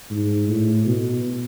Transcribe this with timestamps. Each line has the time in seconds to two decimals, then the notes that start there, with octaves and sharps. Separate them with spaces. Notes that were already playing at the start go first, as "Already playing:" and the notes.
0.10 G#2
0.48 A2
0.86 B2